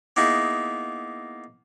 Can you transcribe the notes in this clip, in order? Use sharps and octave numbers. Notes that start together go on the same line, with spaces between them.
A#3 B3 D#4 E4 G#4